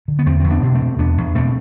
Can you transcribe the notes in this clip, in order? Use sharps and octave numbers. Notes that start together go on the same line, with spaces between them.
D3
B3
E2 A3 C4
E2 C4
B3 D4
B2
A3 C4
B2
E2 B3 D4
E2
B2 A3 C4